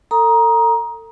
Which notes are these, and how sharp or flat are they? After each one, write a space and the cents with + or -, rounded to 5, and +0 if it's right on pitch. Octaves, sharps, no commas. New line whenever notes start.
A4 +40 A#5 +20 D#6 +5